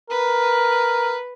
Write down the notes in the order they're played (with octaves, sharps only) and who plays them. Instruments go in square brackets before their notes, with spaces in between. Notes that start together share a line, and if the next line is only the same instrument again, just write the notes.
[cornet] A#4 [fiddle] B4